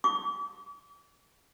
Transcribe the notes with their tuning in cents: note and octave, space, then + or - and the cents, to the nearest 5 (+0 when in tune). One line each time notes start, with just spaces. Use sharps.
D6 -45